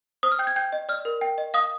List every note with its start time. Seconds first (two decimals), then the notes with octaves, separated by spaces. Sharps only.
0.23 C5 D#6
0.32 F6
0.39 G5 G6
0.47 G#6
0.56 G5 G6
0.72 D#5
0.89 D5 F6
1.05 A#4
1.21 G5
1.38 D#5
1.54 F5 D#6